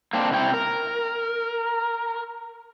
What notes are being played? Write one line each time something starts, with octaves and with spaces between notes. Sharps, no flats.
A#3 C4 D4
C3 E4 G5
A#4